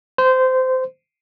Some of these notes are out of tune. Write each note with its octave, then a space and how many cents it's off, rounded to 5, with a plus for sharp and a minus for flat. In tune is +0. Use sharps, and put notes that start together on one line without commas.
C5 -20